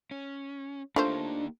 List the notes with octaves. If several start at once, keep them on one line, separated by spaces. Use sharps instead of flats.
C#4
A3 A#3 D4 D#4 F4 G4 C5